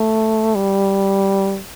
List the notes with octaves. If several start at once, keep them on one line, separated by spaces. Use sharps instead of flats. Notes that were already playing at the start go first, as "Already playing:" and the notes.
Already playing: A3
G3